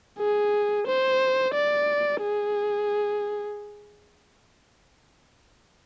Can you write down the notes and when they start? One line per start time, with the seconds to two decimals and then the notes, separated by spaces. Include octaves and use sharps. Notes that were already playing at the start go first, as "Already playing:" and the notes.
0.19 G#4
0.87 C5
1.54 D5
2.21 G#4